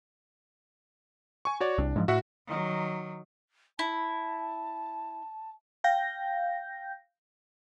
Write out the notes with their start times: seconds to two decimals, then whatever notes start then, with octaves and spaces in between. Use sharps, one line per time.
1.45 G#5 C#6
1.60 F#4 C#5 D5
1.78 C2 D4
1.96 G#2 D3 F3
2.08 A2 F#4 E5 F#5
2.47 D#3 F#3
3.79 E4 A5
5.84 F5 G5 G6 A#6